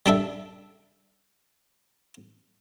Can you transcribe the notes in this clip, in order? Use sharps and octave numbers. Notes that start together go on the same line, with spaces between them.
G3 D4 A4 E5